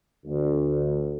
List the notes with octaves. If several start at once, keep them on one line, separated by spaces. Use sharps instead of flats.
D2